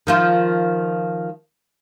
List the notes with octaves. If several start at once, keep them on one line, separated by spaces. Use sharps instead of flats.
D#3 F3 F4